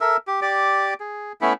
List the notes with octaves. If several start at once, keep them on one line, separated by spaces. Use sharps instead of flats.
A4 A#4 E5 E6
G4
G4 D5 D6
G#4
A3 B3 C#4 E4